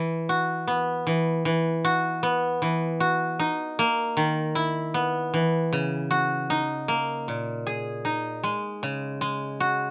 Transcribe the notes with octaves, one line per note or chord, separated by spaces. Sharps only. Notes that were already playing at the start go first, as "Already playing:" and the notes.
Already playing: E3
F#4
B3
E3
E3
F#4
B3
E3
F#4
D#4
A#3
D#3
E4
B3
E3
C#3
F#4
D#4
A#3
A#2
G#4
D#4
G#3
C#3
G#3
F#4